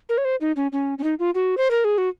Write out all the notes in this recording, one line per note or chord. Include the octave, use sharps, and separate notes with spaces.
A#4
C#5
C5
D#4
C#4
C#4
C#4
D#4
F4
F#4
C5
A#4
G#4
F#4